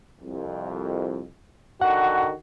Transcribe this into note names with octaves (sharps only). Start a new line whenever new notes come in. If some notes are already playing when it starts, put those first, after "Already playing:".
C2 F2
D3 D#3 F#4 F#5